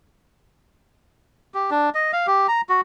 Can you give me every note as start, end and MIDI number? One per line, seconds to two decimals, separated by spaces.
1.54 1.70 67
1.71 1.90 62
1.95 2.12 75
2.13 2.26 77
2.27 2.47 67
2.48 2.61 82
2.69 2.81 66